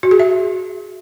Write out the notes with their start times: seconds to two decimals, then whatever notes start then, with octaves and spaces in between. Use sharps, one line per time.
0.03 F#4
0.11 G#4
0.19 E5